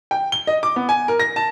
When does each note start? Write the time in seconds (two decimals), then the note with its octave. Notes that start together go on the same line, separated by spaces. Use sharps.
0.11 G5
0.32 G7
0.47 D#5
0.63 D6
0.76 B3
0.89 G#5
1.08 A#4
1.19 A#6
1.36 A5